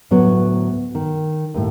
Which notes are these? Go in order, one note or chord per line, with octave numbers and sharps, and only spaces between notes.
D2 A2 F#3 B3 C#5
D#3
D#2 A2